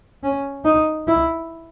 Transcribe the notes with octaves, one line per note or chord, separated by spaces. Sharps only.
C#4
D#4
E4